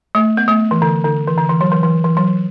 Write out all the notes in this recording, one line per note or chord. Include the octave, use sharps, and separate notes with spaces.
A3
B3
A3
E3
D3
D3
E3
D3
E3
F#3
E3
E3
E3
F#3